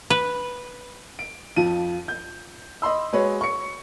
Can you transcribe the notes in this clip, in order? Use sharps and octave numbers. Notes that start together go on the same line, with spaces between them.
B4
D7
F2 F3 D#7
G6
D#5 B5 C6 E6
G#3 F#4 B4 C#5
C#6 C#7